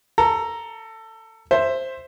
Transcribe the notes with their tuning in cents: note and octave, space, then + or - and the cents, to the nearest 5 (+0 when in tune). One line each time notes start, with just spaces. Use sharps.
A4 +20 A#5 +0
C5 +5 E5 +10